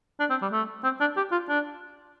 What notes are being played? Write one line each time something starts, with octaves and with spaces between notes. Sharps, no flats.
D4
C4
G3
A3
C4
D4
G4
F4
D4